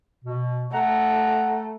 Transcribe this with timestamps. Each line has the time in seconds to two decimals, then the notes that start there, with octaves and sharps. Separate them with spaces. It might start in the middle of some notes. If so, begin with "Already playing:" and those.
0.24 B2
0.73 A3 F#5 A#5